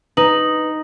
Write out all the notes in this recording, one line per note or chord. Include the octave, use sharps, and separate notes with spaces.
D#4 B4 F#7